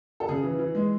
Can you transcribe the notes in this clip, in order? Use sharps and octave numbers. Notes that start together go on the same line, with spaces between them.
A4
C#3 G#4
E3
E3
G#3